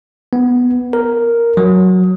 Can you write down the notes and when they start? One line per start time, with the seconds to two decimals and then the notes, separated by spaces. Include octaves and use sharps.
0.33 B3
0.93 A#4
1.57 F#3